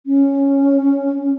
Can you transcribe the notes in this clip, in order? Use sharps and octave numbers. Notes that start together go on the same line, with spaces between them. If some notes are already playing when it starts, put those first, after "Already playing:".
C#4